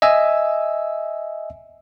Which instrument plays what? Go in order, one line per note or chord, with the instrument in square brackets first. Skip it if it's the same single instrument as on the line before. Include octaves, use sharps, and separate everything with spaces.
[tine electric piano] D#5 E5 G#5 E6